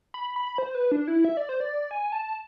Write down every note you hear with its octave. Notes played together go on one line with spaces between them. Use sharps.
B5
B5
C5
B4
D4
E4
E5
D5
C5
D5
G#5
A5